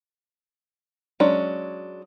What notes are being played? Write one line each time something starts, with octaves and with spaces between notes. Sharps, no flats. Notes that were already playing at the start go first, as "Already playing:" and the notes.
F#3 G#3 C#4 D4